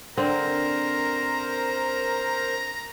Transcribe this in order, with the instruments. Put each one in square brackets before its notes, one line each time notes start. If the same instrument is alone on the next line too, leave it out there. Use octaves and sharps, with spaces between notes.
[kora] D3 C4 [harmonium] A#4 C5 [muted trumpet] A#5